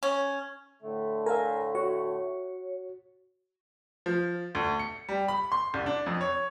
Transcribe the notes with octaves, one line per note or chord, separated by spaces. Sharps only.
C#4
A2 D3 A3
A#4 E5 F5 G#5
F#4 C#5
F3
D2
C#7
G3
B5
C6
C2
D4
F2
C#5